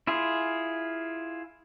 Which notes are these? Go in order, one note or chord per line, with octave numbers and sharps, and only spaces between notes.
E4 F4 G#4